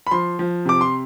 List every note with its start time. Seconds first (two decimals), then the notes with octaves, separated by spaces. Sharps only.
0.07 B5
0.11 F3 C6
0.39 F3
0.65 C3 D6
0.81 C6